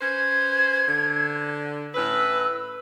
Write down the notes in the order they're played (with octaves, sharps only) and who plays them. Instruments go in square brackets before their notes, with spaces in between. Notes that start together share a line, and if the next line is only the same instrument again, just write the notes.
[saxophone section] C#4 B4 C5 [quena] G#6
[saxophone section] D3
[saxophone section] A2 C#4 B4 [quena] E6